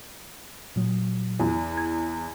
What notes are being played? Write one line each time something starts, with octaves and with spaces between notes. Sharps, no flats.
A#2 F#3
E2
G#6